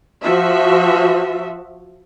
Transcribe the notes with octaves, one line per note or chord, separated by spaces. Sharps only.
F3 F#4 E5